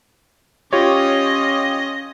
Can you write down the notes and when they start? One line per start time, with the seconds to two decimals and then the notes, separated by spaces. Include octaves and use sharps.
0.73 C#4 F4 G4 C#5 D#5